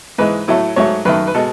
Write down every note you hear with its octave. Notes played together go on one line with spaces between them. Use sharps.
G#2 E3 G#3 B4
A2 F#3 A3
G#2 F#3 A3 C#5
F#2 D#3 A3 B4
B4
B2 G#3 A4